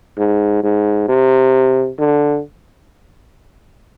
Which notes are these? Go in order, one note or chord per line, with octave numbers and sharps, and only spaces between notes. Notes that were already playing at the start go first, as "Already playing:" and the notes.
G#2
G#2
C3
D3